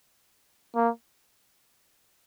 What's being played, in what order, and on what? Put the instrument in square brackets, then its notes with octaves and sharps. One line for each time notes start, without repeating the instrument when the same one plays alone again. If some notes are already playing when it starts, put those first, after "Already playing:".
[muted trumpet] A#3